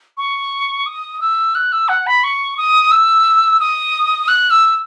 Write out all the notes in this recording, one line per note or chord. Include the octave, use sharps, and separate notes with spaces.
C#6
D#6
E6
F#6
E6
F#5
B5
C#6
D#6
E6
D#6
F#6
E6